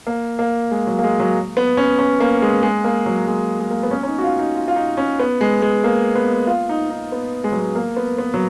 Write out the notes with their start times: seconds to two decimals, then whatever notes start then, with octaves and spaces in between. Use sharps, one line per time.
0.07 A#3
0.39 A#3
0.71 G#3
0.87 F#3
0.99 A#3
1.04 G#3
1.20 F#3
1.57 B3
1.77 C#4
1.99 C#4
2.20 A#3
2.42 G#3
2.63 G#3
2.84 A#3
3.06 F#3
3.27 G#3
3.60 G#3
3.71 A#3
3.83 B3
3.91 C#4
4.03 C#4
4.08 D#4
4.19 F#4
4.24 F4
4.39 D#4
4.55 F4
4.68 F4
4.76 D#4
4.97 C#4
5.19 B3
5.41 G#3
5.62 G#3
5.84 A#3
6.15 B3
6.47 F4
6.69 D#4
6.90 D#4
7.12 B3
7.44 G#3
7.52 F#3
7.59 G#3
7.75 A#3
7.96 B3
8.18 B3
8.34 F#3